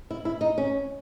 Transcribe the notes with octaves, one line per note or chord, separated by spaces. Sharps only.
E4
E4
D#4
C#4